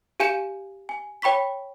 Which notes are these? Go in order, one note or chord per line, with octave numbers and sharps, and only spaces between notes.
G4 F5 G#5 G6 C#7 E7
G#5
C#5 G5 B5 C#6 B6